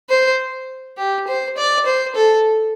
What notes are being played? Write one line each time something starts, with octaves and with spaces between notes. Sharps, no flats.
C5
G4
C5
D5
C5
A4